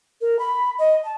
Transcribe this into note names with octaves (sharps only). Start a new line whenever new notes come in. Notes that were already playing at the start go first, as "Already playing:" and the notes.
A#4
B5
D#5
A5